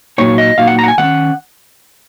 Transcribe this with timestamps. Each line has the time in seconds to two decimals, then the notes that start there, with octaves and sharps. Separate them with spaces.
0.18 A#2 F#3 A#3 D#4 C#5
0.38 D#5
0.58 A#2 F#3 A#3 D#4 F5
0.67 F#5
0.79 A#5
0.84 F#5
0.88 G#5
0.98 D#3 A#3 F#5
1.02 C#4